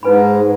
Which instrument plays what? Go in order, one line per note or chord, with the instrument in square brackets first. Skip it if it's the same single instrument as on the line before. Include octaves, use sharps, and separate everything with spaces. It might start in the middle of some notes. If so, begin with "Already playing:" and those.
[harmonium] G#2 [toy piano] D#4 B4 G#5 B5